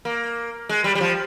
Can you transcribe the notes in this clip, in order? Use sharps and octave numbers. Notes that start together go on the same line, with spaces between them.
A#3
G#3
G3
G3
F3